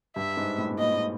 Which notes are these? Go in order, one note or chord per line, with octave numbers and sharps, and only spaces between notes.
G2 E5
G#2
A2
A2
A#2 D#5
A#2